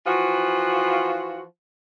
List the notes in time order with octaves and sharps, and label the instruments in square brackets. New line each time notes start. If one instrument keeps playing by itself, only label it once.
[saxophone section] E3 F3 F4 F#4